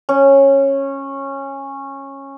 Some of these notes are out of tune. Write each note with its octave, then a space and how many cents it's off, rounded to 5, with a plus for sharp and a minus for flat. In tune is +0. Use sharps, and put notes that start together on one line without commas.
C#4 -15